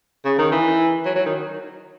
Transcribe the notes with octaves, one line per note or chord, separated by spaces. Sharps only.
C#3
D#3
E3
F#3
F#3
D#3